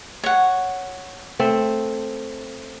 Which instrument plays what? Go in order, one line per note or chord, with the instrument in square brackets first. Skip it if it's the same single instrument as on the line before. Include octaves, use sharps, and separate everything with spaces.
[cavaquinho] C#5 F#5
[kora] A3 C4